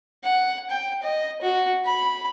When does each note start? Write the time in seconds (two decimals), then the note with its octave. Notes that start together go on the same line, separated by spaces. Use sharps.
0.24 F#5
0.70 G5
1.03 D#5
1.42 F#4
1.85 B5